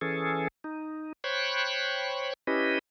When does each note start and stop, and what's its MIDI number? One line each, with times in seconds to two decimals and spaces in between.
0.01 0.48 52
0.01 0.48 61
0.01 0.48 68
0.01 0.48 69
0.64 1.13 63
1.24 2.33 72
1.24 2.33 73
1.24 2.33 79
1.24 2.33 83
1.24 2.33 85
1.24 2.33 90
2.47 2.79 61
2.47 2.79 64
2.47 2.79 67
2.47 2.79 71
2.47 2.79 75